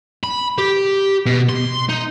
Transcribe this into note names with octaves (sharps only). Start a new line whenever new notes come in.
B5
G4
B2
C6
D#4